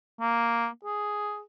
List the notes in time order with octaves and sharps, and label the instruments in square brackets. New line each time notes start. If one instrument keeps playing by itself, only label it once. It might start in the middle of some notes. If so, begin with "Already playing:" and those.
[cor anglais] A#3
G#4